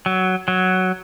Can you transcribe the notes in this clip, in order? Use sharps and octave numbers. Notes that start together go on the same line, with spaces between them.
F#3
F#3